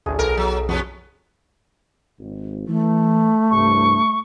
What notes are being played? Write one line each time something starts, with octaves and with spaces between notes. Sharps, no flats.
A1 D2 G#4
B1 A4 A#4
F#3
F2 C3 B3 F#4
G#1
E3 A3
C2 G2 C#6